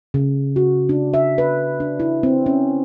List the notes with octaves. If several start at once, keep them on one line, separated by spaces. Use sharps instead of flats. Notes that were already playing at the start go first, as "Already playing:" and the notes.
C#3
F#4
D4
E5
B4
D4
E4
C4
C#4